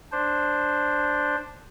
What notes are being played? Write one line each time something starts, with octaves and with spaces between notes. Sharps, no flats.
D4 C5